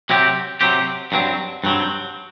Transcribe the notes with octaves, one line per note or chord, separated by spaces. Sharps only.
C3 F#3 C4 G4
C3 F#3 C4 G4
G2 F#3 C4
G2 F#3 C4